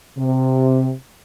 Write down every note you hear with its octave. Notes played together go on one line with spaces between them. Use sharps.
C3